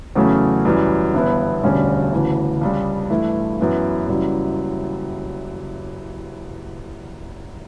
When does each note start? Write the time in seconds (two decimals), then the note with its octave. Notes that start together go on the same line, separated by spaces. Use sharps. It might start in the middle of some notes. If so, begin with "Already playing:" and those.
0.16 E2 C#3 F#3 A3 C#4
0.65 F#2 E3 G3
1.13 G1 G2 E3 B3 E4
1.63 E1 D2 D3 G3 C#4
2.12 D2 C#3 E3
2.61 C#2 C#3 G3
3.10 G2 E3 A3 E4
3.60 F#2 E3 B3 E4
4.09 F#1 F#2 E3 G3